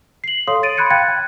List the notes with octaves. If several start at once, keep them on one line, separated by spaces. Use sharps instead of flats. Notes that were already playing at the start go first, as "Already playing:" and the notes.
C7 F#7
A4 C#5 F5 C6 D#6
A6 D7 D#7
B5 C6 F#6 G#6 C#7
F5 G5 F#6 G#6 A6 C#7
G5